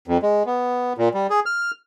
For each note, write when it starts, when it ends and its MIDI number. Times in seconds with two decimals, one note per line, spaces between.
0.08 0.18 41
0.22 0.43 56
0.46 0.93 59
0.98 1.09 46
1.14 1.27 55
1.30 1.40 68
1.46 1.71 89